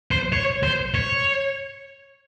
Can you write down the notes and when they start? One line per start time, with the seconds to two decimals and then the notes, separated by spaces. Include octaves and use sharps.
0.11 C5
0.33 C#5
0.63 C5
0.94 C#5